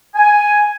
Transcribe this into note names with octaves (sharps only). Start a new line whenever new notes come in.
G#5